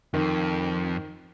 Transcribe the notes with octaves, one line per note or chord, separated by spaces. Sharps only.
F2 D#3